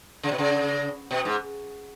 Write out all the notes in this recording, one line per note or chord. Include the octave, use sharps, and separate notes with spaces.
C#3
B2
C#3
B2
G#2